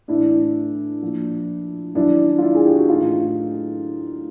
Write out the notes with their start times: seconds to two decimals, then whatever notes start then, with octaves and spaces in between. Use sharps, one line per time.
0.08 A2 E3 D4 E4
1.02 A#2 F3
1.95 F#2 D#3 D4 E4
2.38 F4
2.42 D4 E4
2.54 G#4
2.66 G4
2.77 F#4
2.88 A2 E3 D#4 F4